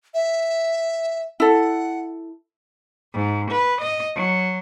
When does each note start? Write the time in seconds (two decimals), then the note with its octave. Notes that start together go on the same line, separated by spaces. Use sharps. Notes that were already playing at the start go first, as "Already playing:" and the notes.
0.14 E5
1.40 E4 A4 F#5
3.13 G#2
3.51 B4
3.81 D#5
4.17 F#3